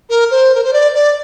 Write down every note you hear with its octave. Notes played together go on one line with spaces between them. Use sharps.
A#4
C5
A#4
C5
D5
D5